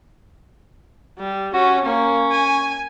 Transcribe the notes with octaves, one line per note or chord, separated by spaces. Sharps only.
G3
C#4 F#4
A#3 C#4
G#5